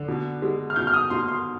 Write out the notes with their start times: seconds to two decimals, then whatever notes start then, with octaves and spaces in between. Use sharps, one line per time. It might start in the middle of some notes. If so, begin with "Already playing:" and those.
Already playing: D3
0.08 B2
0.42 G#3
0.70 F6
0.76 B2 G6
0.87 F6
0.94 D#6
1.10 B2 C6
1.28 C6